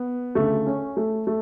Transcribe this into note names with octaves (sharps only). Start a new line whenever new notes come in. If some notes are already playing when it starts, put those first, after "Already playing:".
Already playing: B3
D2 C#3 A3
C#4
A3
A3